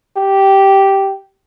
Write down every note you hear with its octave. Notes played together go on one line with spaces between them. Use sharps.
G4